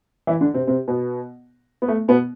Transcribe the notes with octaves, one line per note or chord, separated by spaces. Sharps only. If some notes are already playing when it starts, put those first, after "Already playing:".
E3 E4
D3 D4
C3 C4
C3 C4
B2 B3
B3
A3
B2 B3